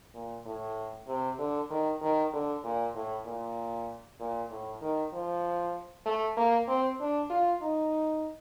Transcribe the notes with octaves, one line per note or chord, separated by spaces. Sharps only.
A#2
A2
C3
D3
D#3
D#3
D3
A#2
A2
A#2
A#2
A2
D#3
F3
A3
A#3
C4
D4
F4
D#4